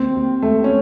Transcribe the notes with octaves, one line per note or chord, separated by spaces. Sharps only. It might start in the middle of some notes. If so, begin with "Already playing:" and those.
Already playing: D#2 C4
D#2
D#2 A3
C#4